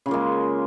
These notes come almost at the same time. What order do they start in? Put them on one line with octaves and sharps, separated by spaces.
C#3 F4 A#3 G#3